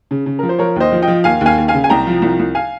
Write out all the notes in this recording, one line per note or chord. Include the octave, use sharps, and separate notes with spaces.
C#3
C#3
F3 A#4
C5
F3 A#4 C#5
D#2 C5 D#5
F3
D#5 G5
F3
D#2 F5 G#5
D#2 F5 G#5
D#2
F5 G#5
C#3
G#5
C2 G5 A#5
F3
C2
C2
F5 G#5